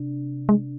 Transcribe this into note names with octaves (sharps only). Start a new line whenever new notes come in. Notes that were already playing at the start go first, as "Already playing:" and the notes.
Already playing: C3 D4
G#3